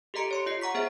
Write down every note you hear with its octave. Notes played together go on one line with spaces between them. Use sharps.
G4 A4 D#5 A#5 C#7 D7
C#5 C6 C#7
F4 D#5 C7
F#5 A#5 C#6 B6
B3 G#4 C5 E5 A#5